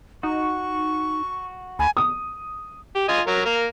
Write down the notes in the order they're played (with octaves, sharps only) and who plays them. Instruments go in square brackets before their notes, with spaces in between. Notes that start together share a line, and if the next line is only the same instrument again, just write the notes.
[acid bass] D#4 [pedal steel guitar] F#4 [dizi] C#6
[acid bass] D2 [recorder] G#5 [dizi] B5
[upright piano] D#6
[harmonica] G4
F4 D#5 G#5
F#3 A#4
A#3 A#4